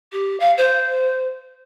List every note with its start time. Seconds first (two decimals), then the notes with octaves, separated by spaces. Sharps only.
0.12 G4
0.39 F5
0.57 C5